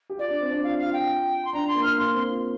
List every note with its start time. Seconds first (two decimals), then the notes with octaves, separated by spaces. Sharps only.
0.10 G4
0.18 F4 D5
0.29 D4
0.41 C4
0.51 D4
0.63 F4 F5
0.79 F5
0.86 F4
0.93 G5
1.45 C6
1.53 D4 A#5
1.67 C6
1.75 A#3
1.83 F6
1.98 A#3 C6
2.13 C4
2.28 F4